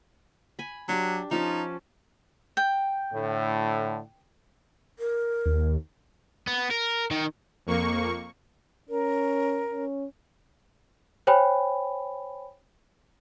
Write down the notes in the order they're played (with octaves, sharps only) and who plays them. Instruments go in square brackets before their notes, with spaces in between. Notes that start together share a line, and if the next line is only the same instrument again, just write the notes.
[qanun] G#5 B5
[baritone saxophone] F#3 [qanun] D4 G4
[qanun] F3 C#4 A5 [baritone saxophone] D#4
[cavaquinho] G5
[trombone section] A2 D3
[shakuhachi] A#4
[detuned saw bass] D#2
[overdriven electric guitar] B3
A#4
D#3
[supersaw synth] F2 A#3 C#6
[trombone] C#4 [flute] A#4
[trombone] C#4
[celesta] C5 C#5 G5 G#5 B5